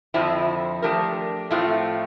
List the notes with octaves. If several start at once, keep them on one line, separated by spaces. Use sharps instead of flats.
F2 D3 F3 C4 E4
F3 A3 D4 G4 A#4
A2 F3 A3 C4 F4